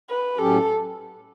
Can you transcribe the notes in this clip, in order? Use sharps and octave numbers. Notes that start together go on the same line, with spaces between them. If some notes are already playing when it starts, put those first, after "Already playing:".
B4
A2 F#3 C#4 G4 A4